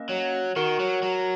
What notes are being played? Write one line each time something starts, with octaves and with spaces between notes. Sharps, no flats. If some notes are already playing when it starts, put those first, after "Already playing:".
Already playing: A#3 C#4 A#4 D#5
F#3
D#3 F#4 A#4 F#5
F#3
F#3